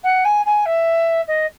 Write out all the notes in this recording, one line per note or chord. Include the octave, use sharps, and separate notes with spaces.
F#5
G#5
G#5
E5
D#5